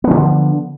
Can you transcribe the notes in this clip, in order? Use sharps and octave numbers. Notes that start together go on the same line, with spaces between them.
D3 F3 B3